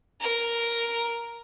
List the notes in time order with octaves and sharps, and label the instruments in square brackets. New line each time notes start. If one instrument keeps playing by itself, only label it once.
[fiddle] A#4 A#5